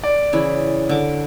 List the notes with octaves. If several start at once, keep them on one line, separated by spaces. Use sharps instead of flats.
D5
C#3 E3 E4
D3 D6